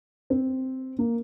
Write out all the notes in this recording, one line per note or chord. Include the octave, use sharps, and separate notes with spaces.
C4
A#3